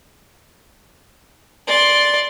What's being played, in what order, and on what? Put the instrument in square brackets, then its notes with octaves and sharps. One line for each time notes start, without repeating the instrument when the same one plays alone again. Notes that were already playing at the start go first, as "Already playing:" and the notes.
[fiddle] D5 C6